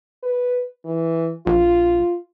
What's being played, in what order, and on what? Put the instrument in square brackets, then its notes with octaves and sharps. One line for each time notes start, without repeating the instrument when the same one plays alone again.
[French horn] B4
E3
[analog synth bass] A#1 [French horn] F4